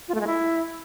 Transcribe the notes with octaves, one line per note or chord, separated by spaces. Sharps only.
F4
A3
G#3
E4